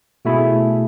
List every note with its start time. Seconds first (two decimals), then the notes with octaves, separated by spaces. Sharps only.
0.25 B2 A3 E4 G#4